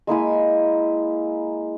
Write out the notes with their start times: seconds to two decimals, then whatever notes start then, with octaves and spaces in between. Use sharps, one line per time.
0.07 G#3 A#3 E4 G#5